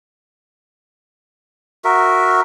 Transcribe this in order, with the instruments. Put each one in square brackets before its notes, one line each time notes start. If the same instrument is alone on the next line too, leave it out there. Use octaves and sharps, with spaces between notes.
[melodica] F#4 A#4 E5